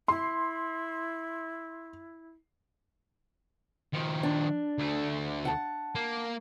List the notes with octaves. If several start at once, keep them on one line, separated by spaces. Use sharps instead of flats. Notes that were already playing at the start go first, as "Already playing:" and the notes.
E4 C6
D#3 F3
D4
D2 A3
F#5 A5
A#3